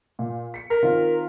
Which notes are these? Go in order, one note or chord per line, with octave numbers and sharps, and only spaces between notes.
A#2
B6 C#7
A#4 B6
D#3 C4 F4